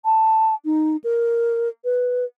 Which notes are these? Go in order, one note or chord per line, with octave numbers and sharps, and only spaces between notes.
A5
D#4
A#4
B4